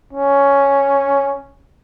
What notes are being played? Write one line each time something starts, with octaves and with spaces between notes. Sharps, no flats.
C#4